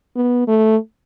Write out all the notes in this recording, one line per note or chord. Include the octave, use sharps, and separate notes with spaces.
B3
A3